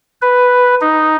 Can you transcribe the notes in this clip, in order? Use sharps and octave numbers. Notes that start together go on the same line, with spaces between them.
B4
D#4